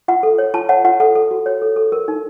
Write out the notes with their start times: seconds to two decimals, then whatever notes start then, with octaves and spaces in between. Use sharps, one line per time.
0.08 F4 F#5
0.23 A4
0.38 C#5
0.54 F4 A5
0.69 C#5 F#5
0.84 F4 F#5
1.00 A4 F#5
1.15 A4
1.31 F#4
1.46 C#5
1.62 A4
1.76 A4
1.92 A#4
2.08 D#4